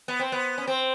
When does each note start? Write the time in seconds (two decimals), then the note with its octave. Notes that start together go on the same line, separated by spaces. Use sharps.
0.08 B3
0.20 C4
0.32 B3
0.58 C#4
0.68 C4